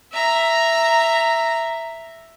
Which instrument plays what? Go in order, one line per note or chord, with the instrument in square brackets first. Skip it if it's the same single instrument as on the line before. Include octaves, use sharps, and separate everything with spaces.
[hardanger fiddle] E5 A#5